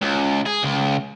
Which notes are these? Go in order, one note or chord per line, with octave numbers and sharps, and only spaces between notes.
C#2
G#4
C#2